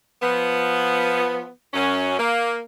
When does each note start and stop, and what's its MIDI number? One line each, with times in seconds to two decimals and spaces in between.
0.22 1.48 53
0.22 1.48 59
1.73 2.16 42
1.73 2.16 61
2.17 2.58 58